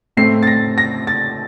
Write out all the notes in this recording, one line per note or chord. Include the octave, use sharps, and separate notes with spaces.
A2 A3 C4 C7
A6
A#6
A#6
A6